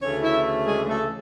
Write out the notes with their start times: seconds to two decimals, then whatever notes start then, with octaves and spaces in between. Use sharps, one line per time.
0.01 D2 C#3 E3 A3 C#4 C#5
0.23 E4 E5
0.67 G#3 G#4
0.88 A3 A4